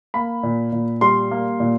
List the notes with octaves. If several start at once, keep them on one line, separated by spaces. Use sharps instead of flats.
A#3 B5
A#2
A#2
G3 C6
A#3
A#2